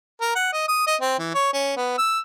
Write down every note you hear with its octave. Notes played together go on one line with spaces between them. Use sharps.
A#4
F#5
D#5
D#6
D#5
C4
E3
C#5
C#4
B3
E6